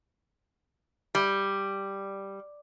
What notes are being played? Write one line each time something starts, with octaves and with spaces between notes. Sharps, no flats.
G3